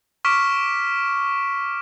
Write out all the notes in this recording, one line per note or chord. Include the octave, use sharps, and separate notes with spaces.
C#6 D6 F6 B6 D7 E7